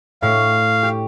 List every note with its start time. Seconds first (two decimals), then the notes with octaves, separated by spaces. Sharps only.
0.22 A2 F5
0.83 G4